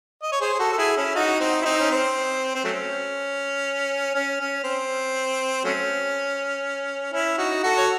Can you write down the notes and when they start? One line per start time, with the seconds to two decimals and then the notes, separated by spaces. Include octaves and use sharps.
0.23 D#5
0.32 C#5
0.41 G#4 C5
0.54 G#4
0.59 F#4 A4
0.72 A4
0.78 E4 G#4
0.97 C#4 E4
1.15 D#4 F#4
1.40 C4 D#4
1.61 E4
1.65 C4 D#4
1.80 C#4
1.90 C4
2.55 C4
2.64 F#3 A3 C#4
4.15 C#4
4.40 C#4
4.64 C4
5.64 F#3 A3 C#4
7.13 C#4 E4
7.38 D#4 F#4
7.63 F#4 A4
7.78 C#5